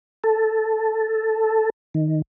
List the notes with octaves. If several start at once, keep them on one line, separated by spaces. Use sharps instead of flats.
A4
D#3